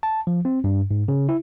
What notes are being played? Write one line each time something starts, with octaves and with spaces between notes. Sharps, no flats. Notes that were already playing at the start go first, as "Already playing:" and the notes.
A5
F3
C4
G2
G#2
C#3
E4